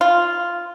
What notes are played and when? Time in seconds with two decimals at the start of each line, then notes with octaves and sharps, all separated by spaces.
0.01 F4